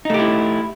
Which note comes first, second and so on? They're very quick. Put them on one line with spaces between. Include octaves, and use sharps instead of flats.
D#4 A3 G4 E4